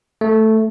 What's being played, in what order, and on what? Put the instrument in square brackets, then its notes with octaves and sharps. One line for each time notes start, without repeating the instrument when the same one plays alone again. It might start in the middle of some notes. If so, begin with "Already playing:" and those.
[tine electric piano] A3